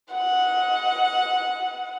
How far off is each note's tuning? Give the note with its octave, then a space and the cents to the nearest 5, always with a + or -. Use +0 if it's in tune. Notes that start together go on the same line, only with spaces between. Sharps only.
D#5 +30 F#5 -10